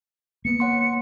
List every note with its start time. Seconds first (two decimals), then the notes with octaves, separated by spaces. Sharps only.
0.45 A#3 B3 C#7
0.60 C#5 F#5 C6